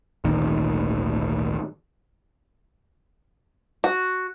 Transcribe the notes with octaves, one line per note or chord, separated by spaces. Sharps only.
G#1 D2 A#2 D#3
F#4